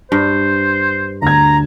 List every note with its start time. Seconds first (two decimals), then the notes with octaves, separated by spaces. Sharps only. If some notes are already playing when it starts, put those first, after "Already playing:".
0.12 G2 C5
1.22 D2 A#5 G#6